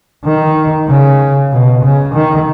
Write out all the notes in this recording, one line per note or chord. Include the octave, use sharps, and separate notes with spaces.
D#3
C#3
B2
C#3
D#3